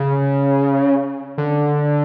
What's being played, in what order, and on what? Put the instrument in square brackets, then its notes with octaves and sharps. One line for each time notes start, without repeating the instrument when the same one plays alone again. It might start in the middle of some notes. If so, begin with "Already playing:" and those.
Already playing: [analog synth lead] C#3
D3